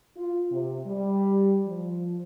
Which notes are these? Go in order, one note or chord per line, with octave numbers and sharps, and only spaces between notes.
F4
C3
G3
F3